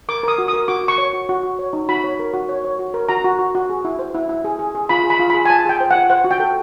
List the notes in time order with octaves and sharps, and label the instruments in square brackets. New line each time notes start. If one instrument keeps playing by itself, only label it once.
[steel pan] A#4 D6
A#4 D#6
F#4
D#6
A#4
F#4 D6
F#4 C#6
C#5
F#4
F#4
F#4
C#5
D#4
F#4 B5
C#5
A#4
F#4
C#5
C#5
F#4
A#4
F#4 A#5
F#4
F#4
F#4
G#4
E4
C5
E4
E4
G#4
G#4
G#4
F4 B5
G#4
B5
F4
B5
G#4
G#5
F4 A5
G#4 G5
C5
F#5
F4
C5 F#5
F#4
G5
A4